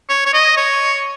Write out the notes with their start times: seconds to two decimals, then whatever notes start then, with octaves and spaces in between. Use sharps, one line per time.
0.09 C#5
0.26 C#5
0.34 D#5
0.57 C#5